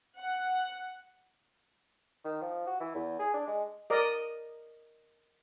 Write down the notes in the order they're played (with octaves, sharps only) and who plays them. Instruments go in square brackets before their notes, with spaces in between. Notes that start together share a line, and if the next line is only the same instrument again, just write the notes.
[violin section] F#5
[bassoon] D#3
F3
F#4
E3
E2
G#4
D4
G#3
[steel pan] A#4 D5 D#5